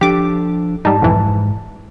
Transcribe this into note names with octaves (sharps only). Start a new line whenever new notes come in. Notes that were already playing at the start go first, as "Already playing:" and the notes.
F3 D4 G4 A4 D6
G#2 G3 D#4 A5
B1 F2 E3